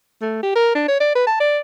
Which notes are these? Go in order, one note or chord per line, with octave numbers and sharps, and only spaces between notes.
A3
G4
A#4
D4
C#5
D5
B4
A5
D5